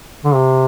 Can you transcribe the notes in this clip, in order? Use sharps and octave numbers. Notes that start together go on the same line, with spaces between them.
D3
C3